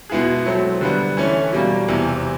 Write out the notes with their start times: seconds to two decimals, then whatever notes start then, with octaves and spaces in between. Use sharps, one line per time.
0.10 B2 G#3 B3 E4 G#4
0.46 F#3 A3 C4
0.81 D3 G3 B3
1.17 E3 A3 C#4
1.52 B2 G3 A#3
1.88 E2 C3 E3